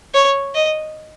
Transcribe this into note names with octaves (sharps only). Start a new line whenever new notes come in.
C#5
D#5